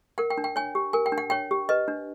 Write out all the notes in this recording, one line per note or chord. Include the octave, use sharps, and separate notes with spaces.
A#4 F#5
G5
D4
G5
C#5 G#5
G4
A#4 G#5
G5
D4
F#5
C#5 G5
G4
B4 D#5
D4